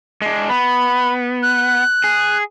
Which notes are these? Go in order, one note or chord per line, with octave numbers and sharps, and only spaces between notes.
G#3 D4
B3 B5
F#6
G#4